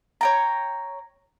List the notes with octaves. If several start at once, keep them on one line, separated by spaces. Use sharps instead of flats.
C#5 G5 A#5